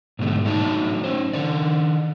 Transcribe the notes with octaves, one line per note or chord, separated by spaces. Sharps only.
G#2 B2 D3 G3 A3
A2 F#3 D4 D#4 A5
C#4 C5
D#3 D4 D5